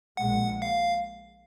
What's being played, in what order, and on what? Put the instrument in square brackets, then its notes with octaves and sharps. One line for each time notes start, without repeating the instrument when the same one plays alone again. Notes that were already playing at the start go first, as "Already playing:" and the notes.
[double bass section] A#1 A#2 G#3 [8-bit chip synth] F#5
[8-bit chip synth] F5